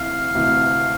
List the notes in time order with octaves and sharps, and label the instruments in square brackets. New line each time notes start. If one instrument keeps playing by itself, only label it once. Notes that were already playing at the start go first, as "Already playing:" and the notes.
Already playing: [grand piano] D2 C3 E3 [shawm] F5
[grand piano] D2 C3 E3